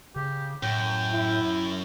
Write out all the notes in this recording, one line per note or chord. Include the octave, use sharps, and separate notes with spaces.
C#3 G4
F#2 A2 G5
E4